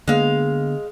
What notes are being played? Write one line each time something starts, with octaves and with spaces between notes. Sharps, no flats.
D3 G#3 A#3 B3 F5